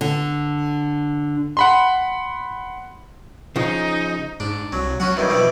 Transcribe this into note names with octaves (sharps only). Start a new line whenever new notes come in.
D3
F#5 B5 C6
C#3 F3 D#4
G#2 D4
C2 F#3
F#3 C#4 F#4 F#5
E2 G2 D#3
B2 E3 F3 G3